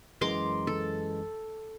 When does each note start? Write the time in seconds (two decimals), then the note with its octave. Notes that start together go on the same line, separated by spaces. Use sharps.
0.21 F#2 E3 G#3 A#5 C6 D6
0.67 A4